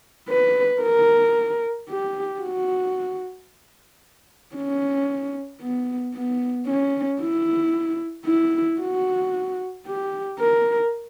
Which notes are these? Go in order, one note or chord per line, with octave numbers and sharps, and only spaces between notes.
B4
A#4
G4
F#4
C#4
B3
B3
C#4
E4
E4
F#4
G4
A#4